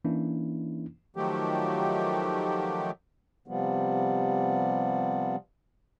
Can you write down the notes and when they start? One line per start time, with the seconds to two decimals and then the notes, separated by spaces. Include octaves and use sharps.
0.05 E3 A#3 C#4 D4 E4
1.16 D#3 F3 F#3 A3 G4
3.48 C3 F3 G3 B3